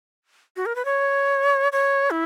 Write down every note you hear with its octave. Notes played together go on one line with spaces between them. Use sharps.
F#4
A#4
B4
C#5
C#5
E4